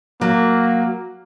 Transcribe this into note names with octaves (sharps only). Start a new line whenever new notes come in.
F#3 A#3